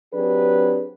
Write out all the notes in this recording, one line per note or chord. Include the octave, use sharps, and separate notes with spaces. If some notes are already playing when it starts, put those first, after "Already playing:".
F#3 C4 D4 G4 G#4 B4